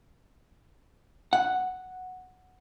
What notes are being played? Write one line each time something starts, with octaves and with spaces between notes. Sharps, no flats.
F#5